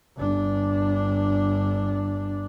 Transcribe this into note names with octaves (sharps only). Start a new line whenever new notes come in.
G1 D4